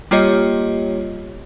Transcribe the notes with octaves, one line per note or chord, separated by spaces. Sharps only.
G3 A#3 F4 G4 C#5 D#5